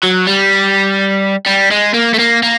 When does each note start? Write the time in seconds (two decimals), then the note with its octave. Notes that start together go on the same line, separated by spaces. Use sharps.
0.03 F#3
0.27 G3
1.47 G3
1.71 G#3
1.94 A#3
2.14 A3
2.19 A#3
2.43 A#3